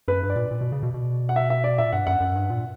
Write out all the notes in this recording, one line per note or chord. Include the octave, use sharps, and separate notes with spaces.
F#2 B4
G2
D5
A#2
A#2
B2
C#3
B2
B2
F#5
E5
E5
D5
A#2 E5
G2 F#5
F#2 F#5
F#2
G2
A#2